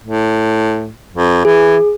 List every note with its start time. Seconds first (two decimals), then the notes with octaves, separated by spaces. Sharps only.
0.03 A2
1.14 F2
1.45 E3 G#4